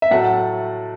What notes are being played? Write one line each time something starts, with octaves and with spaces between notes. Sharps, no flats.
E5
A2 F#3 A3 F#5